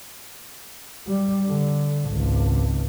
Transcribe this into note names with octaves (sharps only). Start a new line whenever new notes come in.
G3
D3
G#1 C#2